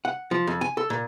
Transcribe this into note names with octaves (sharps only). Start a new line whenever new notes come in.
F#5
F3
F2
G#5
A4
A#2